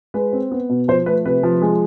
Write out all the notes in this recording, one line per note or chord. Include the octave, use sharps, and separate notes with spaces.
G#3 B4
C4
B3
B2
F3 C5
A3 B4
C3 B4
F3
G#3